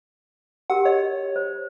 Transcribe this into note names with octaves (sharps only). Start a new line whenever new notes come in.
F#4 G4 A#4 F#5
C#5 D#5
C5